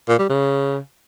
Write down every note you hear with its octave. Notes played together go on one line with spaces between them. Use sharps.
A#2
G3
C#3